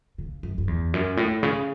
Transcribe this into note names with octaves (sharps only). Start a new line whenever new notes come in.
C#3
F#2
F#2
E2
F#2
A2
C#3